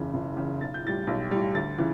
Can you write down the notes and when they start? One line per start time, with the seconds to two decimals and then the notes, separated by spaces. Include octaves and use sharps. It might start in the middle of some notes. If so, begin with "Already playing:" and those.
Already playing: F#1 E2 C#3
0.14 F#1
0.37 E2 C#3
0.60 B1 A6
0.74 G6
0.85 A2 G3 A6
1.07 B1
1.31 A2 G3
1.54 D2 A6
1.78 C#3 E3